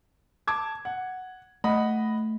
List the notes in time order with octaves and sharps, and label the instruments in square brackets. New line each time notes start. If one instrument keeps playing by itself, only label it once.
[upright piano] A5 D6 G#6
F#5
[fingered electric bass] A3 [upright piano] D#5 F#5 B5